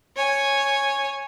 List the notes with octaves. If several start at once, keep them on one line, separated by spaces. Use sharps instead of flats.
C#5 G#5